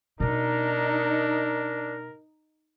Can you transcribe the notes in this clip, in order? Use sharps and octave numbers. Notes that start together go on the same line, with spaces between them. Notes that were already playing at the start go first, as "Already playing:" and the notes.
B2 B3 D4 D#4 A#4